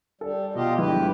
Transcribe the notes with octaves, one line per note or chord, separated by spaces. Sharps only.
G3 A4
B2 F4 G4 D#5
G1 F#3 G#3 E4 G4 B4